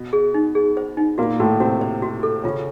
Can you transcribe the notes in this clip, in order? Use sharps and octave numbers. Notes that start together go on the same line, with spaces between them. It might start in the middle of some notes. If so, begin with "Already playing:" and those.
Already playing: B2
G#4
D#4
G#4
C5
D#4
A#2 A#3 F#4
A2 A3 F#4
C3 C4 F#4
C5
F#4
A4
C#3 C#4 F4